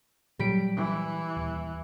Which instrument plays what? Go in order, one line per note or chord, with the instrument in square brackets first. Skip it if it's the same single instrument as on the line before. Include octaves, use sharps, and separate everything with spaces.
[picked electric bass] A#2 F#3 [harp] G3 B6 D7
[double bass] E3
[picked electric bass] D#1